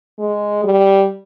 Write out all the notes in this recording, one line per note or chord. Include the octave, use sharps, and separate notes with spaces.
G#3
G3